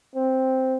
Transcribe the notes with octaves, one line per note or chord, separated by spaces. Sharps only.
C4